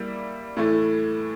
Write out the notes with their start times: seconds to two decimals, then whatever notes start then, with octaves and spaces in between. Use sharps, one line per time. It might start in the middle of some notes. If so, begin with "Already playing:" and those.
Already playing: G3 A#3 E4
0.56 A2 E3 A3